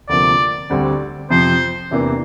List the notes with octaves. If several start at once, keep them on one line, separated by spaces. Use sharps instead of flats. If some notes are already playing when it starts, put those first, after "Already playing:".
D2 C3 F3 A#3 D5
D2 D3 G3 C4
F2 C3 F3 C5
E2 C3 E3 A#3 D4